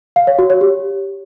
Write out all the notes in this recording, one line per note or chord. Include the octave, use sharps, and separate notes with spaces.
F5
C#5
F#4
C#5
G4